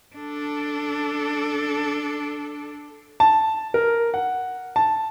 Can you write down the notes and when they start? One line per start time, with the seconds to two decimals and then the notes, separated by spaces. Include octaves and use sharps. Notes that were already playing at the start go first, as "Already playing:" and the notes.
0.15 D4 A4
3.20 A5
3.74 A#4
4.14 F#5
4.76 A5